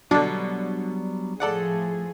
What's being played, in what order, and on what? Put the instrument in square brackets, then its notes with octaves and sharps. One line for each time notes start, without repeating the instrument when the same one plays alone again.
[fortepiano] B2 D3 [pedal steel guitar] F#3 G3 B3 [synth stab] D4
[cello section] A2 F3 G#4 [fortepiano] A4 D5 F#5